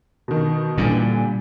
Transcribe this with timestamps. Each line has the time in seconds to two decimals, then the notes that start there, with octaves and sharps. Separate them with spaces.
0.28 B2 D#3
0.78 A#2 D3 E3 G3